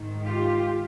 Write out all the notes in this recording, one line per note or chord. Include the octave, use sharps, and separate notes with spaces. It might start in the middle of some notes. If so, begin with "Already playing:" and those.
Already playing: G#2 D#3
F4 G4